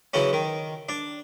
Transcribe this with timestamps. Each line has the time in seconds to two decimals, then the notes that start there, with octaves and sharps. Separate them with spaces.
0.14 C#3 E3 F#3 C#4
0.33 D#3
0.89 D4